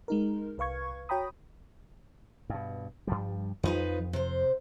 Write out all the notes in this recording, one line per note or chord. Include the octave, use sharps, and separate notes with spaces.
G#3 D#4 A#4
C2 B4 F5 C#6 G#6
F#4 C#5 G5 A#5 B5 D#6
G2 B2
G2 F3 G3
F2 F3 D#4 B4
C3 C5